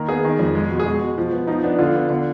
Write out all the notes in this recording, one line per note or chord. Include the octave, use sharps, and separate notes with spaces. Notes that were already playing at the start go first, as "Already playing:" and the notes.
Already playing: D#3 A#3 D#4
B3 G#4
D#3
F2
G#3
B2
G#4
G#3 F#4
B2
F3
B3
F3 D#4
B3 D4
D3 F4
B3
D3